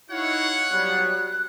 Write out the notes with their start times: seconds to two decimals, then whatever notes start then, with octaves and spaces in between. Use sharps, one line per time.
0.11 D#4 E4 F#4 C#5 F5 F#5
0.71 F#3 G3 B3 F#6